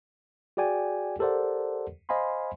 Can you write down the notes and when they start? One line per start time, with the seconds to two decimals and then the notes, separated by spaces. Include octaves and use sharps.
0.57 F#4 G#4 D5 G5 G#5
1.19 G4 A4 A#4 C5 D5 F#5
2.09 C5 D#5 F5 G#5 B5 C6